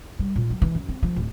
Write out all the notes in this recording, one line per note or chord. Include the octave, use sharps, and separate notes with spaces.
G3
A#2
F#3
E3
F#2
C4
F3
D1